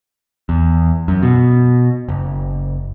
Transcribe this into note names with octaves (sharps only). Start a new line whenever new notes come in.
E2
F#2
B2
F#1